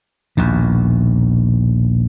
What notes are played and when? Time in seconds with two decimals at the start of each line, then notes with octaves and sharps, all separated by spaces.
0.37 A#1 D#2 B2